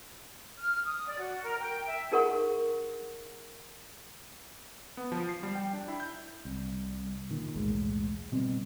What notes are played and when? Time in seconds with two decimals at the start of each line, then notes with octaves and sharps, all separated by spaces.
0.58 F6
0.85 D#6
1.07 D5
1.19 F#4
1.43 A#4
1.59 G5
1.86 E5
2.11 D#4 G#4 A#4 F#5 C#6
4.97 B3
5.12 F3
5.29 C7
5.43 G3
5.55 G5
5.73 D4
5.88 E4
6.00 G6
6.45 C2
7.31 A#2 D#3
7.55 B1 E2 A2 G#3
8.32 B2 G3 C4